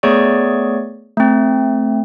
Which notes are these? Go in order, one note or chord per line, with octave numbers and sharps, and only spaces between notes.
A3 B3 G#4 C#5 D5 C#6
A3 C4